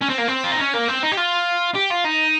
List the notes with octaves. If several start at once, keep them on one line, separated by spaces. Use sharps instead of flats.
C#4
C4
A#3
C4
F4
D#4
C#4
A#3
C4
D#4
G4
F4
G4
F4
D#4